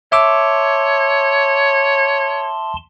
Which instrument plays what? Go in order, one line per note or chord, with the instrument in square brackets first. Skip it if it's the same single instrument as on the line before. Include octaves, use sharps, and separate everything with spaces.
[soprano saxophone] C#5 [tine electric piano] E5 D6 E6 [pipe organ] A5 C6